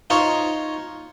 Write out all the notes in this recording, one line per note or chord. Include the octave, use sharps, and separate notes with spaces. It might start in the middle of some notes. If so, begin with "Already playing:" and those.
D#4 F4 C5 C#5